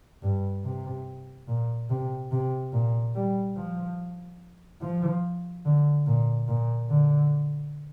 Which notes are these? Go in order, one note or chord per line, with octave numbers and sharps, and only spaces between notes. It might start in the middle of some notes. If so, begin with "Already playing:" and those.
G2
C3
A#2
C3
C3
A#2
G3
F3
F3
D3
A#2
A#2
D3